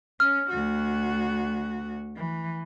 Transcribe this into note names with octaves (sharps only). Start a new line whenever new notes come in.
C#4 F6
D2 F#4
E3